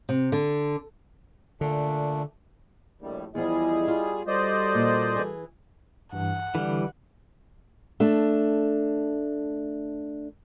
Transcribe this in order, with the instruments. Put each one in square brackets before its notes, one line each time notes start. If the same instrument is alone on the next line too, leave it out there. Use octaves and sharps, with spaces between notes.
[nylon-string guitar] C3
D3
[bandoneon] A#2 A3 D4 [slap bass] D3
[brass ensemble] A#1 D#2 A2 [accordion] G3
[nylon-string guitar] E2 F3 [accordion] G3 G#4 [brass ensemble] E4 D#5
[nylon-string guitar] F4
[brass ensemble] G3 F#4 A4 [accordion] C5 D5 D#5
[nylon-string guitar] A#2
E3 G#4
[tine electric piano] G2 E3 [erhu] F#5
[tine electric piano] D3 [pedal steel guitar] E3 G3
[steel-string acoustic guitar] A3 D4